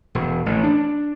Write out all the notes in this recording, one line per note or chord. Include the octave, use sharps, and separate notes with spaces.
E1
A1
D4